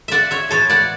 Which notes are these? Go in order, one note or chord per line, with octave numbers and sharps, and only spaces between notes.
D5 E5 F#5
C#5 E5
A2 E3 B3 A4 C#5
D5 F#5